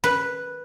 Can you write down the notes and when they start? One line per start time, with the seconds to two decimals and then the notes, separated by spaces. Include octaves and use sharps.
0.04 B4